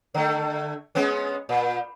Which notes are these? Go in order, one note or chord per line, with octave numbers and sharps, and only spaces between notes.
D3 A3
G#3 B3 C#4
A#2